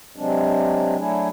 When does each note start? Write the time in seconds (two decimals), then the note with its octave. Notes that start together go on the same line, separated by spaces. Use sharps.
0.16 C3 F#3 G#3 C4 D4
0.98 F#3 A3 D4 E4 G#4